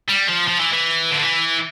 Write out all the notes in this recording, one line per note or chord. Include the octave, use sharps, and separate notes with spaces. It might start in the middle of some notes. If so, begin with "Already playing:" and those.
G3
F3
F3
E3
E3
D3
E3